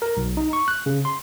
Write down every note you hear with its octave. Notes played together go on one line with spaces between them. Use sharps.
A#4
B1
D#4
C#6
F#6
C#3
C6